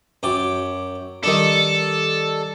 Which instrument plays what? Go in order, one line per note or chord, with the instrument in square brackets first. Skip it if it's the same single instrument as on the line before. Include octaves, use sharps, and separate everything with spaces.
[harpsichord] F#2 G5 D6
[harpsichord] D#3 G3 D4 [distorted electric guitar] A4